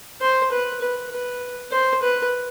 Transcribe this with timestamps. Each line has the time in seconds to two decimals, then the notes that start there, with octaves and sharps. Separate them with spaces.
0.21 C5
0.51 B4
0.81 B4
1.12 B4
1.72 C5
2.02 B4